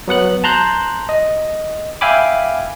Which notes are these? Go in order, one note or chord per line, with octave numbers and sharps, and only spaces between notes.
F#3 B3 F#5 F#6
A5 A#5 C6 F#6 G6
D#5
E5 F5 G5 G#5 B5 D6